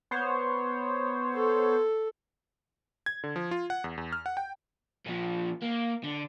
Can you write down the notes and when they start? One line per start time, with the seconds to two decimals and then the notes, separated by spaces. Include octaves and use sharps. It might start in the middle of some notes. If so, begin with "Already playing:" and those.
0.11 B3 C5 C#5
1.34 A4
3.06 G#6
3.24 D3
3.36 F3
3.51 F4
3.70 F#5
3.84 E2
3.97 E2
4.13 F6
4.26 F#5
4.37 G5
5.06 A#2 F3
5.62 A#3
6.04 D3